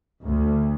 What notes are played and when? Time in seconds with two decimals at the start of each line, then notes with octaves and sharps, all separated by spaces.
0.25 D2